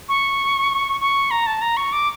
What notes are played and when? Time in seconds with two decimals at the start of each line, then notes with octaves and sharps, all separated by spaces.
0.09 C#6
1.01 C#6
1.31 A#5
1.47 A5
1.61 A#5
1.77 C#6
1.92 D6